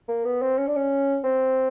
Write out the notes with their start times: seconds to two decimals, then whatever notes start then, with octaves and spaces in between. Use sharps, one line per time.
0.08 A#3
0.25 B3
0.42 C4
0.58 C#4
0.67 D4
0.76 C#4
1.24 C4